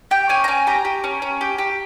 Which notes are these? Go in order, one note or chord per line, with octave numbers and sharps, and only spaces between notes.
G4 G5
C#4 G#5
A#5
C#4 G#5
G4 A#5
G4
C#4
C#4
G4
G4